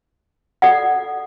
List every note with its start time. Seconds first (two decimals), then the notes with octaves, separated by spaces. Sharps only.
0.62 A4 D5 F#5